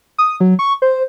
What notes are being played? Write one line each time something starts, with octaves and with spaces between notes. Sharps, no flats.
D#6
F#3
C#6
C5